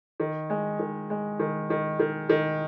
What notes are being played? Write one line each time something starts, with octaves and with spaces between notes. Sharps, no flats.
D#3
G#3
D#3
G#3
D#3
D#3
D#3
D#3